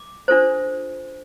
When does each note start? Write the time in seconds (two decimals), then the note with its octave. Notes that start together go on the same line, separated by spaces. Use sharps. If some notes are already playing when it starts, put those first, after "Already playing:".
Already playing: D6
0.28 D4 F4 A4 C5